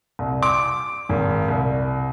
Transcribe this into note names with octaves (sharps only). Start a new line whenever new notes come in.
C2
D6
G#1
C2